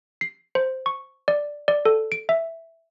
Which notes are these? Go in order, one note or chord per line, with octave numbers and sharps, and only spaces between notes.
C7
C5
C#6
D5
D5
A4
D7
E5